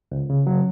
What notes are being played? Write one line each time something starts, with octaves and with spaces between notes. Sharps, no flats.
C#2
C#3
F#3